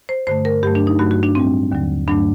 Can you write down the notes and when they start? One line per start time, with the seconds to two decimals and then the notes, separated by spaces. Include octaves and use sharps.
0.09 C5
0.27 G2 D3 A3 C5
0.45 A#4
0.63 G2 F#3 A3 G4
0.75 D4
0.87 D#4
0.99 G2 F#3 A3 F#4
1.11 F#4
1.23 D4
1.35 A2 G3 C4
1.72 D#2 D3 F#3
2.07 G2 F#3 A3 D4